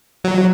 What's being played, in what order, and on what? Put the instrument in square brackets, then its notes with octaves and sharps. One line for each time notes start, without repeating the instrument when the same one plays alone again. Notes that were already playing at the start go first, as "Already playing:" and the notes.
[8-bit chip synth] F#3